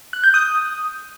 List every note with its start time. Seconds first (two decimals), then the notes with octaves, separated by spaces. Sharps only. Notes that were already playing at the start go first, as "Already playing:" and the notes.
0.13 F#6
0.24 G6
0.34 D#6